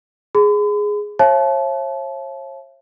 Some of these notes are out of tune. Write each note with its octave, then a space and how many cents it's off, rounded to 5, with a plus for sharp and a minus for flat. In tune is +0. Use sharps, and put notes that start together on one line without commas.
G#4 +0 B5 +45
C#5 -45 E5 +40 A5 -30